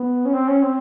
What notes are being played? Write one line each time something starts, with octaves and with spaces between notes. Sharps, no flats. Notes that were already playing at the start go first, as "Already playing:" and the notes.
Already playing: B3
C#4
C4
C#4
C4